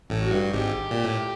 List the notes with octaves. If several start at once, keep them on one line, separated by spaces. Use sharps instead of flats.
A1 A2
F#4
G2
G#1 G#2 G4
A#2
A2